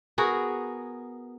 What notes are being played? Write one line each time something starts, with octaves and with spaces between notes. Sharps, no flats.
B3 F#4 G#4 A#4